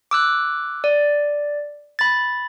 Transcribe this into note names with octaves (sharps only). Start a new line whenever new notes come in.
D6 E6 F#6
D5
B5 A6